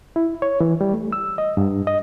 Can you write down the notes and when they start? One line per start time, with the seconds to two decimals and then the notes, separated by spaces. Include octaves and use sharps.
0.16 E4
0.42 C#5
0.61 E3
0.81 G3
0.94 A3
1.13 E6
1.38 D#5
1.57 G2
1.87 D#5